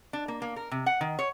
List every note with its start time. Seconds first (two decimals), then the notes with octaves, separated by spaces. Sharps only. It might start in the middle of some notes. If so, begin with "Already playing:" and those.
0.13 D4
0.28 A#3
0.42 A#3
0.56 A#4
0.71 C3
0.86 F#5
1.01 D#3
1.19 C#5